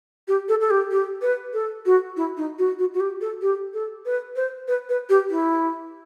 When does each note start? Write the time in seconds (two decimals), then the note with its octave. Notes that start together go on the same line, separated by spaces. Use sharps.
0.28 G4
0.49 A4
0.61 A4
0.70 G4
0.91 G4
1.22 B4
1.53 A4
1.86 F#4
2.17 E4
2.37 D#4
2.59 F#4
2.79 F#4
2.94 F#4
3.00 G4
3.21 A4
3.42 G4
3.74 A4
4.06 B4
4.36 C5
4.68 B4
4.89 B4
5.09 G4
5.30 E4